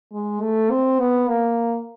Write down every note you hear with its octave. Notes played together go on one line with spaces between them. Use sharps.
G#3
A3
C4
B3
A#3